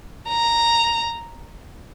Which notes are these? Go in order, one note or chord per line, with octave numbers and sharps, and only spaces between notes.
A#5